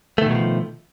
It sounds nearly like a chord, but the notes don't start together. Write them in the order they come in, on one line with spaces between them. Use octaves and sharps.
A3 D#3 B2 F#3 F3